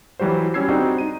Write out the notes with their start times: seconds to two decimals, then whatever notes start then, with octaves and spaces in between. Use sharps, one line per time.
0.19 E3 F#3 G3 F#4 C5
0.54 F#3 G3 C#4 E6 G#6 C7
0.69 G3 C4 D4 D#4 F#4 G#4
0.98 D#4 D#7